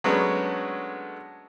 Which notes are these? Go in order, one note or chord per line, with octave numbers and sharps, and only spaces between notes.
F#3 G#3 A3 B3 C#4 D4